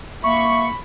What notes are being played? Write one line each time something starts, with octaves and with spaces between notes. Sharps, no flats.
A#3 E5 B5 C#6